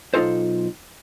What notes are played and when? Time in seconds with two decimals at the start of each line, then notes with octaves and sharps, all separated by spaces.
0.14 B1 D#3 D#4 F4 A4 C5